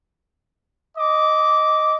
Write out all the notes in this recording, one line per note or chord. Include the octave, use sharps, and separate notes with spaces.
D#5 D6